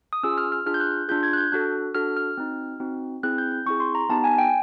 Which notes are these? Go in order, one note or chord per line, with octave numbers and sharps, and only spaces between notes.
D#6
C#4 F4 G#4 E6
F6
F6
D4 F4 G#4 F6
G6
F#6
D4 F4 G#4 G6
G#6
F#6
G6
D4 F#4 A4 F#6
D4 F#4 A4 F6
F6
C4 D#4 F#4
C4 D#4 F#4
C4 E4 G#4 F#6
G6
G6
C4 E4 G#4 C#6
C6
A#5
B3 D#4 G4 A5
G#5
G5